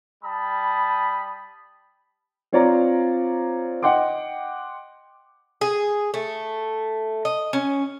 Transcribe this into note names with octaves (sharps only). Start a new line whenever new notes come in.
G3 A5 B5 D#6
C4 F4 C#5 D5 A#5
D#5 F#5 G5 C6 D6
G#4
A3
D#5
C#4